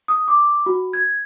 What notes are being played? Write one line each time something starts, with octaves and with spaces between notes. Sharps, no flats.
D#6
D6
F#4
G#6